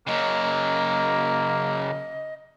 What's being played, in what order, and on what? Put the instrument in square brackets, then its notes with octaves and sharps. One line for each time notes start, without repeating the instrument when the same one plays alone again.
[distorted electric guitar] C#3 F#3 [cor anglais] A#3 [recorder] D#5